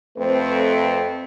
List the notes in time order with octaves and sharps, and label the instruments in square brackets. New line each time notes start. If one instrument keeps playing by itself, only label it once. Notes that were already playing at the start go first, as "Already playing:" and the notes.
[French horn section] F2 A3 C4 B4